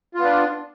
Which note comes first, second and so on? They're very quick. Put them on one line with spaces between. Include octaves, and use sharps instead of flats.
F4 B3 D4